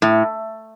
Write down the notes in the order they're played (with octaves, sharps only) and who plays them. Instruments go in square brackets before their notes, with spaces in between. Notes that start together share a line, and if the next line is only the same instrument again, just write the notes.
[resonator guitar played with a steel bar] A2